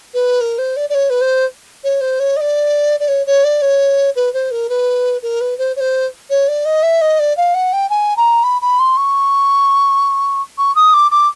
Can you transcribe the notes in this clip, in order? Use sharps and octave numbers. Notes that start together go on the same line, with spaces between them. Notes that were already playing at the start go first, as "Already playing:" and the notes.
B4
A#4
C5
D5
D5
C#5
B4
C5
C#5
C5
C#5
D#5
D5
D5
C#5
C#5
D5
C#5
B4
C5
A#4
B4
A#4
B4
C5
C#5
C5
C#5
D5
D#5
E5
D#5
D5
F5
F#5
G5
G#5
A#5
B5
B5
C6
C#6
C#6
D#6
D6
D6